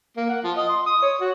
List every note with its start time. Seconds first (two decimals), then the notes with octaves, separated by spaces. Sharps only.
0.17 A#3
0.29 F#5
0.44 F3
0.57 D#5
0.69 C6
0.86 D#6
1.02 C#5
1.21 F#4